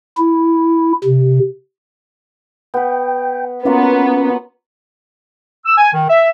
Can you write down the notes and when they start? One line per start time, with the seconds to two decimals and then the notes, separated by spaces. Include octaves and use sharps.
0.17 E4
1.04 C3
2.74 B3 B4 G5
3.65 F#3 A#3 B3 C#4 F4
5.66 E6
5.78 G#5
5.94 D#3
6.09 E5